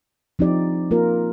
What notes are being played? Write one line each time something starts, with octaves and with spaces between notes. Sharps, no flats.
F3 C4 D#4 G4 D5
A#3 F4 A#4